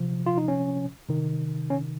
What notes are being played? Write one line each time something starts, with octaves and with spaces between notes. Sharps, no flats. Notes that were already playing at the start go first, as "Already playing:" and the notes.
Already playing: C3 F3
F4
D#4
C#4
C3 D#3
C#4